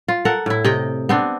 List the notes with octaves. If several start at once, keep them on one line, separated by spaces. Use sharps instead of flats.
F4
A4 A#4 F#5
A2 E4
C3 D#5 G5
B3 C4 D4